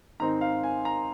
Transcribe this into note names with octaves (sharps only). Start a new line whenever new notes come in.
G#2 D#3 C4 D#4 A#5
F5
G#5
A#5